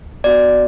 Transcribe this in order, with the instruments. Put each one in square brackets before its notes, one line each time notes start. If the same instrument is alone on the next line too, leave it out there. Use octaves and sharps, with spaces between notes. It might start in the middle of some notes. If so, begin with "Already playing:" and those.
[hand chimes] B3 D4 F#4 D5